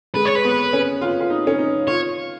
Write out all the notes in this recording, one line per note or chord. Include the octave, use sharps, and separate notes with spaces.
G#3 B4
C#5
B4
B3
C#4
F4
F4
D#4
C#4
D#4
F4 C#5